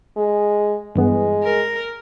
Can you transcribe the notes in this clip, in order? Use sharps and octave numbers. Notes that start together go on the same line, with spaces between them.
G#3
G2 E3 G#3 B3
A#4